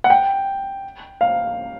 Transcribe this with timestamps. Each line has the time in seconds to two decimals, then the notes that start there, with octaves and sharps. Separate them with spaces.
0.04 F#5
0.10 G5
1.21 F5